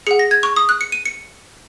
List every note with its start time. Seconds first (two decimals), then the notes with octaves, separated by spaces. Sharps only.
0.07 G#4 F#5 C#7
0.19 A#6
0.31 G#6
0.43 C#6
0.56 D#6
0.69 F#6
0.81 C#7
0.92 D#7
1.05 C#7